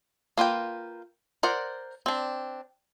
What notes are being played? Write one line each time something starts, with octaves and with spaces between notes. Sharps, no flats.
A#3 F4 B4 G5
A#4 C5 D5 F#5
C4 D4